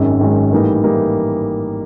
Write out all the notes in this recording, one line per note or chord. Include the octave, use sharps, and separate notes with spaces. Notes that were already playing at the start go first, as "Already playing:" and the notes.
Already playing: G#1 F#2 D#3 G#3 C#4
G#1 F#2 D#3 G#3 C#4
A2 E3 G3 A#3 D#4
A2 E3 G3 A#3 D#4